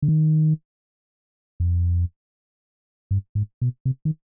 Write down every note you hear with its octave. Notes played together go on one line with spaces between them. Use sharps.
D3
D#3
F2
G2
G#2
B2
C3
D#3